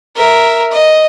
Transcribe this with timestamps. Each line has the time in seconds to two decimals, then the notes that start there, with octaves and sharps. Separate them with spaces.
0.16 A#4 E5
0.72 D#5